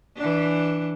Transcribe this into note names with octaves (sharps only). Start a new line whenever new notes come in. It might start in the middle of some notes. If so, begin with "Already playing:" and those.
E3 D4